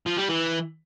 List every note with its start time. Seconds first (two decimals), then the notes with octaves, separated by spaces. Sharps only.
0.06 F3
0.18 G3
0.29 E3